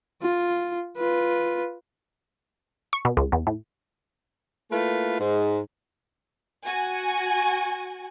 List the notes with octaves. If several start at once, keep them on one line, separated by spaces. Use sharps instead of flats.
F4
F4 B4
C#6
B2
C#2
E2
A2
A3 A#3 E4 F4 B4
G#2
F#4 G#5